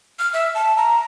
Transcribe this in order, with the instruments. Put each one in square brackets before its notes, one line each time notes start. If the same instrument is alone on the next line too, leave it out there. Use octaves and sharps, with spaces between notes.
[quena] F6
E5
A5
A#5